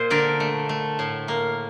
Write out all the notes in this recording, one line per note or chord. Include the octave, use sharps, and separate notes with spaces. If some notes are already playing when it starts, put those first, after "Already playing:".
Already playing: A#2 C5
D3 A#4 D5
A3
A3
A2
A#3